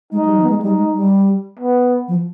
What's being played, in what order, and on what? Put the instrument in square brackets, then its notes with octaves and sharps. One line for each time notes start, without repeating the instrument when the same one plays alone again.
[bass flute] G#3 [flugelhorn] D#4
[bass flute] G3
F3
B3
G#3
[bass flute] G3 [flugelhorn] D#4
[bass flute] G#3
G3
[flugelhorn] B3
[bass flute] F3